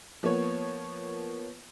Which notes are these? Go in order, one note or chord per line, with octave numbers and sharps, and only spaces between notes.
F3 A#3 B3 C#5